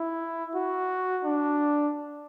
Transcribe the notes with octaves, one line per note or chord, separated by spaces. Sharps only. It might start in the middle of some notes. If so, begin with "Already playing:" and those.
Already playing: E4
F#4
D4